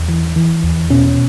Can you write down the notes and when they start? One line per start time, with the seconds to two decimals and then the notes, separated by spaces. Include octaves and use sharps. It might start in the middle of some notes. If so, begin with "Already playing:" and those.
Already playing: E2
0.09 E3
0.36 E3
0.63 E2
0.90 B2 C#4